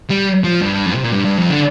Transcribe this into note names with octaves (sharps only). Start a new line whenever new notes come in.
G3
F3
G2
F2
C3
A#2
G2
G2
F2
D3